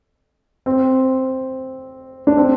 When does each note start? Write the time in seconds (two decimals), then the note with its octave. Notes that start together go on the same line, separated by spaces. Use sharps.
0.66 C4
2.27 D4
2.37 C4